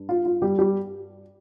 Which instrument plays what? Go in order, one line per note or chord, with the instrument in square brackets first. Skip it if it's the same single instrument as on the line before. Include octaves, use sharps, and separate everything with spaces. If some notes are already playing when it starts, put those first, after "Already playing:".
Already playing: [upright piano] G2
F4
F4
G3 G4
G3 G4